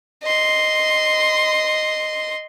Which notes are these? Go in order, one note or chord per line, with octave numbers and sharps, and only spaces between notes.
D#5 C6